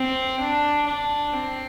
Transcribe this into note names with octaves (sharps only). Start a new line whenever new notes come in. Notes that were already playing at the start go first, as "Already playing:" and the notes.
Already playing: C4
D4
D4
C4